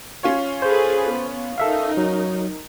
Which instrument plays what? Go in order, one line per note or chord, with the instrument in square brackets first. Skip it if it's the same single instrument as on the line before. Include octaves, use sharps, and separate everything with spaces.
[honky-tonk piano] C#4 F4 C#5
[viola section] G#4 A4 B4 [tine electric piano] C5
[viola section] B3
[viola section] D#4 A#4 [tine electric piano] A4 E5 F5
[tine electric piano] F#3